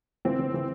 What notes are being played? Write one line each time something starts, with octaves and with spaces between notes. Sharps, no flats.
E3 C4
E3
E3